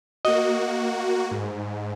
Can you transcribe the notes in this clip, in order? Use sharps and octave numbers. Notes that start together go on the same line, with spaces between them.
A#3 F#4 D#5
G#2